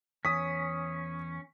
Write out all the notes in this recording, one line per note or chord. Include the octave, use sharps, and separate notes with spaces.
E2 C#4 D#6 B6